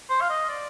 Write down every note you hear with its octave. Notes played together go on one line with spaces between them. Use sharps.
C5
F5
D#5
D5